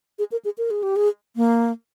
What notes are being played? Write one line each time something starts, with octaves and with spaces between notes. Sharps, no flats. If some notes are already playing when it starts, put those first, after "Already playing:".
G#4
A#4
G#4
A#4
G#4
G4
G#4
A#3